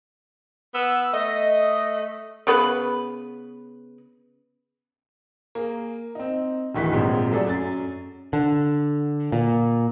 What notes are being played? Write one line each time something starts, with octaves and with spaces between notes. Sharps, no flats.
B3 E6
A3 D#5
C#3 B3 B4
A#3 G#4
C4 D#4
D1 D2 D#3 E3 C#6 B6
A#1 D#2 G#2 C3 F3
F#3 A3 G#4 A4 D5
F#2 A6
D3
A#2